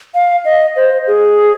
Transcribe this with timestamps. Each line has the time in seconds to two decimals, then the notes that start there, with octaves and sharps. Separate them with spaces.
0.14 F5
0.45 D#5
0.76 C5
1.07 G#4